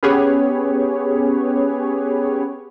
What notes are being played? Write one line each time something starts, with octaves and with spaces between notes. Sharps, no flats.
B3 C#4 G4 G#4 B4 C#5